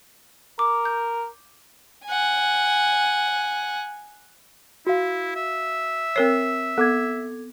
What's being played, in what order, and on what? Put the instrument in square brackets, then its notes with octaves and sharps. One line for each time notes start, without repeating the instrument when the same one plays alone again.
[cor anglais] A#4 [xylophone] D6
[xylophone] G6
[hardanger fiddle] F#5 G#5
[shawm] E4 [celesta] F#4 F5
[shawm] E5
[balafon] C4 A#4 C#5 [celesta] E6 C7
[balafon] B3 [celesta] A4 D6 G#6